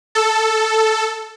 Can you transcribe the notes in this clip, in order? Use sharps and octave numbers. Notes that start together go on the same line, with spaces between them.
A4